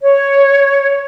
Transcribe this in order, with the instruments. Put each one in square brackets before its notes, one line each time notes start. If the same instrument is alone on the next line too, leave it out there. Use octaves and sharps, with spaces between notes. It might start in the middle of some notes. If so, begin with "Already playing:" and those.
[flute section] C#5